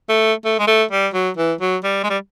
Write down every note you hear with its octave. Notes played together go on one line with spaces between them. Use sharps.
A3
A3
G#3
A3
G3
F#3
E3
F#3
G3
G#3
G3